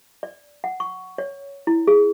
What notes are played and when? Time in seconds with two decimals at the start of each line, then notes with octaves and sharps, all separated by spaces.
0.23 D5
0.64 F#5
0.80 C#6
1.18 C#5
1.67 E4
1.87 G#4